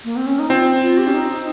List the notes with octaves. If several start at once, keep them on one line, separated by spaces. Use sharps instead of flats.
A#3
C4
C#4
D#4
C4 F4
F4
G4
C#4
D#4